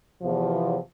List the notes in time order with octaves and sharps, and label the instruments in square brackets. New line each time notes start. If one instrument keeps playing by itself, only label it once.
[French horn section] E2 C3 F3